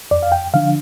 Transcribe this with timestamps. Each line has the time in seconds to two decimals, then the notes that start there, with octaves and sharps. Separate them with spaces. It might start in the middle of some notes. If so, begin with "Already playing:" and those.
0.11 F2 D5
0.23 F5
0.32 G5
0.54 D3 F3 D4 F5